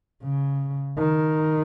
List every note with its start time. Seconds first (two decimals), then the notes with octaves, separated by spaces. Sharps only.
0.23 C#3
0.98 D#3